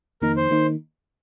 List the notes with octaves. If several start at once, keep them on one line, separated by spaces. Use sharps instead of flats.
F2 D#3 A#3 D#4 A#4
C5
D#3 A#3 D#4